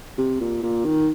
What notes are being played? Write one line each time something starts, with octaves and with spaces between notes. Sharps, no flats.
C3
A#2
A#2
D#3